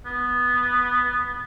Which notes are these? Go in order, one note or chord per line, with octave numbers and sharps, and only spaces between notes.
B3